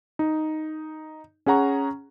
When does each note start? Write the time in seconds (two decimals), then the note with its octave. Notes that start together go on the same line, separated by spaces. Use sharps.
0.19 D#4
1.46 C#4 G#4 F#5 A#5 C#6